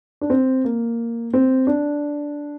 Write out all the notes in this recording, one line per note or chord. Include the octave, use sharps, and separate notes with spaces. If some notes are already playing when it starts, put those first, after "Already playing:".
D4
C4
A#3
C4
D4